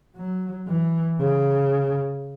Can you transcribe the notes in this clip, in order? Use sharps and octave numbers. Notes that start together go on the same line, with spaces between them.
F#3
E3
C#3